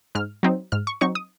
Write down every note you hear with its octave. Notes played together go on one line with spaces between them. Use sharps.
G#2 F6
F#3 C4 D#4
G#2 F6
C#6
F#3 C4 D#4 C#6
D#6